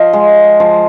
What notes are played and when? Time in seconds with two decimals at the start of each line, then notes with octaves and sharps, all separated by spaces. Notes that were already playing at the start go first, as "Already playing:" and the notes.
Already playing: F3 D#5 F5
0.13 G#3
0.60 F3